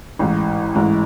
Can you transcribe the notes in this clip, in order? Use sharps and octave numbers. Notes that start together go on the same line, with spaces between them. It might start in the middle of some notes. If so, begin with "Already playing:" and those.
A1 G#2 E3
A1 G#2 E3